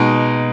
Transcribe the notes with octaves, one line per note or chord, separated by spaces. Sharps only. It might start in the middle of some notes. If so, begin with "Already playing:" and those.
Already playing: B2 G#3 D#4